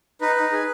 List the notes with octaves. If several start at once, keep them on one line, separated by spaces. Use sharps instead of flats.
D#4 B4
D#4
G#4